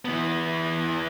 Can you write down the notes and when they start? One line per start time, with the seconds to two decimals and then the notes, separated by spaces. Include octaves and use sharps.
0.05 E3 B3